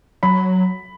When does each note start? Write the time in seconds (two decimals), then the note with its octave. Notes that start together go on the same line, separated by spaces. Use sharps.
0.23 F#3 B5